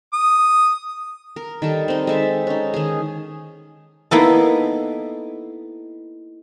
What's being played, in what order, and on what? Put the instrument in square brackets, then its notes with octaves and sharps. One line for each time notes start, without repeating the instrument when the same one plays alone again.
[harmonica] D#6
[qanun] A#4
D#3 G3 A4
C4 D#4
G#3 A4 E5
C#4 D#4
D#3 G#4
[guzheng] A#3 B3 A4 [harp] D#4 E4 D#5